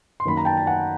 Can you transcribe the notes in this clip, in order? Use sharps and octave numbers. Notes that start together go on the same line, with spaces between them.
C6
F#2 D#3 F#3 A#3 B5
A#5
G5 A5
A5
F#5 G#5